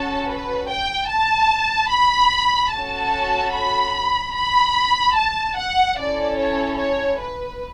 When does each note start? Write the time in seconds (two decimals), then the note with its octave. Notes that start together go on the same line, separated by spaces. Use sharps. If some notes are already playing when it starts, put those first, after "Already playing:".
Already playing: C#4 F#4 A4 A5
0.29 B4
0.69 G5
1.09 A5
1.90 B5
2.72 C#4 F#4 A4 A5
3.54 B5
4.35 B5
5.16 A5
5.57 F#5
5.98 C#4 E4 A4 D5
6.39 C#5
6.79 C#5
7.20 B4